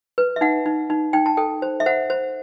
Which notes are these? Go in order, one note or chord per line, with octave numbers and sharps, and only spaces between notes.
B4
E5
D#4 F#5
D#4
D#4
D#4 G5
A5
A4 G5
C5
E5
C5 F#5
C5